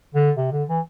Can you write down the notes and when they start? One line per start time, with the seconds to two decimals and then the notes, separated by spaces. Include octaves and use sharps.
0.14 D3
0.37 C3
0.52 D3
0.69 E3